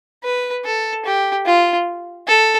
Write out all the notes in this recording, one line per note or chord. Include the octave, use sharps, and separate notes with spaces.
B4
A4
G4
F4
A4